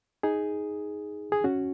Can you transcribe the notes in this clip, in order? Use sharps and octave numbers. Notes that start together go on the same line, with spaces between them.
D#4 G#4
G#4
C#4 F#4